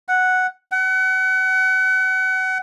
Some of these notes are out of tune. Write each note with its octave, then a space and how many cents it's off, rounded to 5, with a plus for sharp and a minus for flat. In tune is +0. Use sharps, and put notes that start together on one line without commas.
F#5 +0
F#5 +30